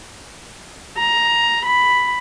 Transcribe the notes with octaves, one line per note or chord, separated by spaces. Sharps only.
A#5
B5